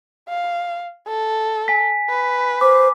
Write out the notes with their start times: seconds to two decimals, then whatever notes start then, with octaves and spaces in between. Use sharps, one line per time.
0.29 F5
1.08 A4
1.68 G#5 B6
2.10 B4
2.61 C5 D6